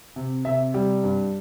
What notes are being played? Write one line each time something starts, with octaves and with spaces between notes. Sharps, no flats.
C3
C3 E5
G3
G2